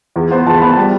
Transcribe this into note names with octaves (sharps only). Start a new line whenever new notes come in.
E2
B3 C5
E2 A5
B3 B5
A5
G3